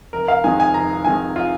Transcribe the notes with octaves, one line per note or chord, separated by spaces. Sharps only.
F1 A#4
F5
F2 D#3 G#3 G#5
G#5
F1 A#5
F2 D#3 G#3 G#5
F4